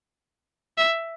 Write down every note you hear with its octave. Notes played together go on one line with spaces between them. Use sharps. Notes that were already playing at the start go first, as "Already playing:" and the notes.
E5